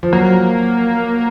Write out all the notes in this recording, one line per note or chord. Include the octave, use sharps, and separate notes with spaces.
F3
F#3 A#3